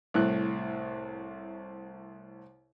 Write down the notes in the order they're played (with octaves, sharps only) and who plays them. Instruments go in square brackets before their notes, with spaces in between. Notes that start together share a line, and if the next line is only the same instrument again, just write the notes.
[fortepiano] C2 A2 F#6